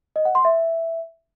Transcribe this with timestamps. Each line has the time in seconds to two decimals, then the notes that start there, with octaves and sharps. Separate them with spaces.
0.16 D#5
0.25 F#5
0.35 C6
0.45 E5